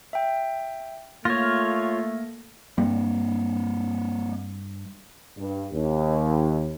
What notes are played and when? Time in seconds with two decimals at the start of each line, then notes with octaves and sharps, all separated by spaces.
0.13 E5 G5
1.25 A3 A#3 F4 C#5 F6 A#6
2.78 G2 A#3 C4
5.37 G2
5.72 D#2